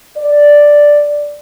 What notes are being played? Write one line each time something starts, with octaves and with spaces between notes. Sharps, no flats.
D5